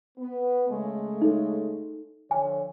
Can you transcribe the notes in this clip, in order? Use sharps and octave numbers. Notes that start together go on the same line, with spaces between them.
B3
C#3 G#3 A3
D#4 A4
D3 F3 C#5 G#5